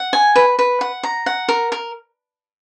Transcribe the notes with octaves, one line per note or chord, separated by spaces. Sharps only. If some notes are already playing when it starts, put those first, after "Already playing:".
Already playing: F#5
G#5
B4
B4
F#5
A#5
F#5
A#4
A#4